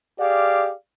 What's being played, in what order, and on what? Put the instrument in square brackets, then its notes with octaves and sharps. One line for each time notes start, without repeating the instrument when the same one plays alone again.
[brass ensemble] G4 G#4 D5 F5